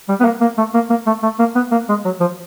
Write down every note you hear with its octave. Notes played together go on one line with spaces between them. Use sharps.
G3
B3
A#3
A#3
A3
A#3
A#3
A3
A3
A#3
B3
A#3
G#3
F#3
F3